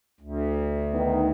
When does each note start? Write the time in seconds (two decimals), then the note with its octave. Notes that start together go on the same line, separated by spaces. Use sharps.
0.20 D2
0.94 D#3 B3 D#4